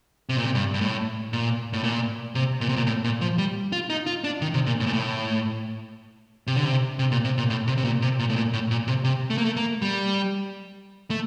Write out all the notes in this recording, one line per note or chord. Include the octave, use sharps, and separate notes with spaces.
C3
A#2
C3
G2
G2
A2
A#2
A2
A#2
C3
A#2
C3
A#2
A2
A#2
F3
G3
F4
D#4
F4
D4
D#3
C3
A#2
A2
A#2
A2
C3
D3
C3
C3
A#2
C3
A#2
A2
C3
C3
A#2
C3
A#2
A2
A#2
A2
A#2
C3
C3
A3
A#3
A3
A#3
G3
A3